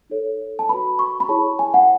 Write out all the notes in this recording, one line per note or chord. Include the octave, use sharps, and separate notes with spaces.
D#4 A4 C#5
A5
F#4 B4 B5
C#6
B5
E4 G#4 C#5 A5
G#5
F#5